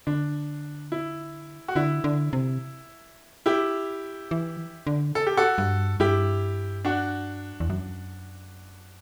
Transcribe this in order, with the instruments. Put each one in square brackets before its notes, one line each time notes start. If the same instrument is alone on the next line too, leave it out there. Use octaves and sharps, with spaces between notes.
[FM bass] D3 [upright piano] D4
[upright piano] E4
F#4
[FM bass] D3 [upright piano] E4
[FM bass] D3
C3
[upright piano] E4 G4
[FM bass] E3
D3
[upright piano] A4
G4
F#4 A4
[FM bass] G2
[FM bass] G2 [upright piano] E4 G4
[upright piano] D4 F#4
[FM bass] E2
F#2